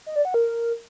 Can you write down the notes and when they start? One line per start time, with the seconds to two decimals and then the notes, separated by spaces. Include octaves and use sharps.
0.06 D#5
0.16 D5
0.25 F#5
0.34 A#4